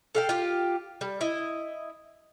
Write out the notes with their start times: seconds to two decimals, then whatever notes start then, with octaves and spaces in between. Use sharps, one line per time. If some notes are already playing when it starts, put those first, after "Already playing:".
0.15 A4 F5 G5
0.29 F4 G4
1.01 G3
1.21 E4 D#5